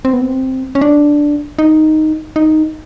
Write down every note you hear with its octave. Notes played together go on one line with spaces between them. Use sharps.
C4
B3
C4
C#4
D4
D#4
D#4